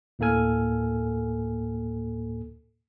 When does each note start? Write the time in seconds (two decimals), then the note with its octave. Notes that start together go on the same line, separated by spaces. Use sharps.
0.19 D2 A2 A#3 A4 G#5 F6